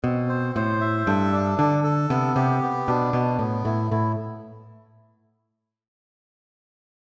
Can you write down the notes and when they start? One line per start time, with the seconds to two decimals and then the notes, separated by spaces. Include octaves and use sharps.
0.04 B2 C4
0.29 C5
0.56 A2 C5
0.81 E5
1.07 G2 A4
1.32 D4
1.59 D3 A4
1.84 A4
2.10 C3 B3
2.36 C3 G4
2.62 B3
2.88 B2 D4
3.13 B2 B3
3.39 A2 B3
3.65 A2 E4
3.91 A2 E4